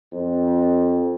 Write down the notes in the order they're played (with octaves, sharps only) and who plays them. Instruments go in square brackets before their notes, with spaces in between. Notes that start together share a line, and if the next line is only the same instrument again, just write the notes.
[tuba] F2